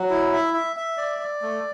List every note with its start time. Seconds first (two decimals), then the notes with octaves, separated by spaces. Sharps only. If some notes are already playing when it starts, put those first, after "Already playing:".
Already playing: F#3
0.10 E4
0.33 E5
0.54 E5
0.76 E5
0.97 D5
1.19 D5
1.42 A3